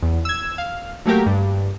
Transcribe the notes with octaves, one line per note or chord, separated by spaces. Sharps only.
E2
E6 G#6
F5
F#3 A3 A#3 G4 A#4
G2